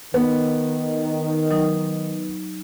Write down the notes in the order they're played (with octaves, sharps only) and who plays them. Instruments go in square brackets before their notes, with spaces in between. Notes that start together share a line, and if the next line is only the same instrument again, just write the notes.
[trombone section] D#3 [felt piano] B3
[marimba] F#3 D#4